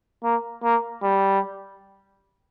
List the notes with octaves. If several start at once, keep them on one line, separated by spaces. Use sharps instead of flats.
A#3
A#3
G3